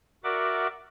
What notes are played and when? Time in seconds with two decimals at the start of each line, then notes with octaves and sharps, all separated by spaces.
0.24 F#4 A#4 D5 E5 F#5 D6